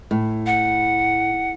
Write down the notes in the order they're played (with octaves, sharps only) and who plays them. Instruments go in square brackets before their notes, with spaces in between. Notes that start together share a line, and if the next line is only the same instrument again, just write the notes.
[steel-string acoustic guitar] A2
[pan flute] F#5